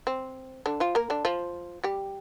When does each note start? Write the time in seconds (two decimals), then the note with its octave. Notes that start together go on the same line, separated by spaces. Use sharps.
0.07 C4
0.66 D3 D4
0.80 F3 F4
0.95 A#3 A#4
1.10 D3 D4
1.25 F3 F4
1.84 G3 G4